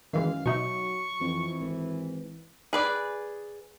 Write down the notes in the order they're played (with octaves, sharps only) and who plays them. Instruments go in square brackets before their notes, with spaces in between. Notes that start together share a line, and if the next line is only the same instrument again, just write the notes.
[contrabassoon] F#2 [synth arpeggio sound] D#3 E3 G#3 [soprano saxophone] F5
[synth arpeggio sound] B2 D#4 E5 [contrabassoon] F#3 [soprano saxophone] C#6
[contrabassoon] F2 [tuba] E3
[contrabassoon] G#1
[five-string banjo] G#4 B4 D5